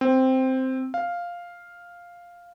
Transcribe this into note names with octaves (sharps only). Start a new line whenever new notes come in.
C4
F5